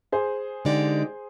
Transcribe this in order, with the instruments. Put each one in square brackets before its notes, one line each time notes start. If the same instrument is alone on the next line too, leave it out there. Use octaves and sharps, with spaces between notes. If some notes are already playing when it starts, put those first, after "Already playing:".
[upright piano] G#4 C5
[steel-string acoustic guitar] D3 G#3 D#4 G4 D5